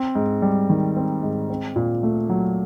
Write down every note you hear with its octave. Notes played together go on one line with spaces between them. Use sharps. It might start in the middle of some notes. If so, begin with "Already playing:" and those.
Already playing: C4
G#2
G3
D#3
C4
G#2
C4
A#2
A3
F#3